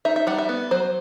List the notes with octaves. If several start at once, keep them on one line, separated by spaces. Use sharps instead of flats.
D#4 E5
E5
G3 F#5
E5
B3
F#3 C5